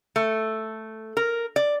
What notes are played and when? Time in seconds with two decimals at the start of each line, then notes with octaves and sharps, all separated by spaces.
0.16 A3
1.17 A#4
1.56 D5